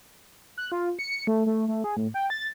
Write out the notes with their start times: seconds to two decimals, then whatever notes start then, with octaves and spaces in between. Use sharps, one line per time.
0.58 F#6
0.72 F4
0.99 C#7
1.27 A3
1.46 A3
1.68 A3
1.84 G#4
1.97 A2
2.14 G5
2.30 A6